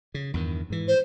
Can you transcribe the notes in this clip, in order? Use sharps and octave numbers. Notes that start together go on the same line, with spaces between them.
C#3
E2 G2 D#3
G#2 E3
C5